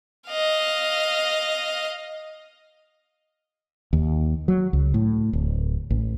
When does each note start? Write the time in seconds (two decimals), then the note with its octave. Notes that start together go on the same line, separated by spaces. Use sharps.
0.28 D#5 F5
3.93 D#2
4.48 F#3
4.73 C#2
4.94 A2
5.33 D1
5.90 A1